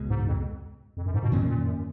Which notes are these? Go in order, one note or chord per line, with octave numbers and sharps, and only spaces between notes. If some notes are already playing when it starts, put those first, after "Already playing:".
Already playing: C#2 B2 G#3
G#2
F2
F2
F#2
G#2
B2
F2 A#2 D#3 A#3 C#4
A#2
F#2